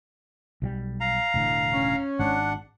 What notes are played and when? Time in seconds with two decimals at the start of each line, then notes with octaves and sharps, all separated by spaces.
0.62 B1 F3 G3
1.00 F5 A#5
1.34 E1 A2 D3
1.73 C#4
2.19 G#1 G#2 D4 F#5